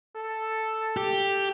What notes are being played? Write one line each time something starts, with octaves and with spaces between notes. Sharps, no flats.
A4
G4